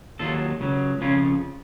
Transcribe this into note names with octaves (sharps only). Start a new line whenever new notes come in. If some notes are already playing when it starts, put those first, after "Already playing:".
D#2 D#3 F#3 F4 A4
C#2 C#3 F#3
F2 C#3 F3 C#4 F4